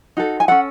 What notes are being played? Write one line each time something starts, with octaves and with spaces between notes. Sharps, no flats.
D#4 F#4 A4
G#5
C#4 F#4 A4 F#5